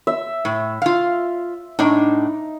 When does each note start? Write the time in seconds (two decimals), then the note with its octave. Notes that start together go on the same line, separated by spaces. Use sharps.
0.07 E5
0.45 A2
0.82 F4 F5
1.79 A2 D4 D#4